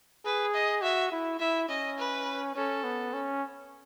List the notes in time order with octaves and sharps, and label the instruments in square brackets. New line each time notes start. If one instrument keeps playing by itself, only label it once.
[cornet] G#4 [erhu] B4
[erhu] D#5
[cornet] F#4 [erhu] E5
[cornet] E4
[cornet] E4 [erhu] E5
[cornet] C#4 [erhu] D#5
[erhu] B4
[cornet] C#4 [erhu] A4
[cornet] B3
C#4